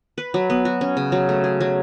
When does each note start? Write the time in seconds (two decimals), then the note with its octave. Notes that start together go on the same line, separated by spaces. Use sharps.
0.18 B4
0.34 F#3
0.50 B3
0.65 F#4
0.81 C#4
0.97 C#3
1.12 F#3
1.29 A3
1.44 G#4
1.61 F#3